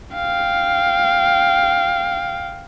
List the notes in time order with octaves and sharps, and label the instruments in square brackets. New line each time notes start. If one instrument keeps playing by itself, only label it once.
[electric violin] F5 G5